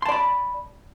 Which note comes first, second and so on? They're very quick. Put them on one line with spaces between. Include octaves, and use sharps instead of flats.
C6 A5 D5 B5